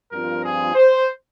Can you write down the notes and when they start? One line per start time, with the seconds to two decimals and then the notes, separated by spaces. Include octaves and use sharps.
0.12 G2 F3 C4 F4 A#4
0.43 G#4
0.75 C5